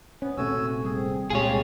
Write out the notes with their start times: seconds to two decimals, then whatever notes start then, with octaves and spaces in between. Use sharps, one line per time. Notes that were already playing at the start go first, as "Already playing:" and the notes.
0.22 B3 C#4
0.37 D#1 C3 A3 F#4 G#5 E6
0.85 G3 C4 G#4
1.30 C2 A#2 G#3 F4 G4 G#4 C#5